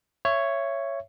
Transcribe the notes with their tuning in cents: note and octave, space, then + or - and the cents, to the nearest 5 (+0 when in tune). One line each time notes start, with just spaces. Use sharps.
C#5 +0 E5 +25